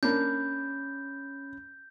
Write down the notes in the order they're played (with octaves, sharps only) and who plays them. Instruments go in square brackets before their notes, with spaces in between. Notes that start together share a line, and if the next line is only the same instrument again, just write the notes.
[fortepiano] A#3 D4 [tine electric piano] C#4 B5 [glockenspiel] G6